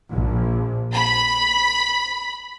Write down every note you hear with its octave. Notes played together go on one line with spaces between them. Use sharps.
A#1
B5